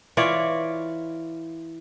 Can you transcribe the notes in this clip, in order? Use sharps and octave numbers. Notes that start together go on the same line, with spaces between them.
E3 F4 C#5 D5